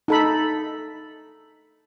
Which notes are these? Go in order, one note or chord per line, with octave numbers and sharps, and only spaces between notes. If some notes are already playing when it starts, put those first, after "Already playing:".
D#4 A4 B5